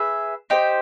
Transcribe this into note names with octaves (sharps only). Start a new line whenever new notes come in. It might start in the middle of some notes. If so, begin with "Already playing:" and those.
Already playing: G#4 B4 E5
D#4 G4 C5